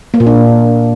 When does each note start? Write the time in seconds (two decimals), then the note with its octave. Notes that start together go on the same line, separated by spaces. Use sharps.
0.14 A#3
0.20 A#2
0.27 D4